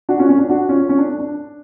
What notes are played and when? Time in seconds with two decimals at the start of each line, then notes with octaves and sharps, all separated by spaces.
0.09 D4 F#4
0.19 C#4 F4
0.29 C#4
0.39 D4
0.49 D4 F#4
0.69 C#4 F4
0.89 C#4
0.98 D4
1.09 D4
1.19 D4